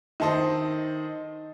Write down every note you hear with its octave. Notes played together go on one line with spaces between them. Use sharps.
D#3 D#4 A4 C5 D#5